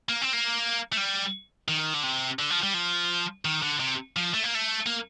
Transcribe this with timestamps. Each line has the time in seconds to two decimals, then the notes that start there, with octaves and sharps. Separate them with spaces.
0.09 A#3
0.22 C4
0.33 A#3
0.92 A3
0.97 G3
1.68 D#3
1.94 D3
2.03 C3
2.39 D3
2.50 F3
2.63 G3
2.74 F3
3.45 D#3
3.63 D3
3.80 C3
4.16 F3
4.34 A3
4.43 A#3
4.54 A3
4.86 A#3